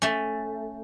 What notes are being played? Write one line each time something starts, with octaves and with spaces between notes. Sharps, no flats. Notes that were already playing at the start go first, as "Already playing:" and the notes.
A3 C#4